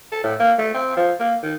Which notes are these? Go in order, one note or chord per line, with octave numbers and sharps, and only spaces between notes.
A4
A2
A#3
A3
C4
F3
A#3
D#3